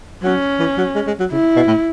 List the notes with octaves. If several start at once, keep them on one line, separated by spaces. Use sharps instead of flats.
F#3 C#4
E3
F#3
G#3
G#3
F#3
C#3 E4
B2
A2